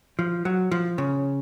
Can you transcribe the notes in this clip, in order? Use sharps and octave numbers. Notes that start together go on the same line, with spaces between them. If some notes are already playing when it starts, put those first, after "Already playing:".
F3
F#3
F3
C#3